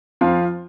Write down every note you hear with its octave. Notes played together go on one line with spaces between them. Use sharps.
F2 F3 F4